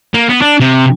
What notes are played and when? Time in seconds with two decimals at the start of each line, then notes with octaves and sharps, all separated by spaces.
0.14 A#3
0.29 B3
0.41 D4
0.60 C3